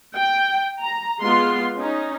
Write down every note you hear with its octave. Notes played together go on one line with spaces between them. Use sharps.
G5
A#5
G#3 B3 F4 C6
C#4 D#4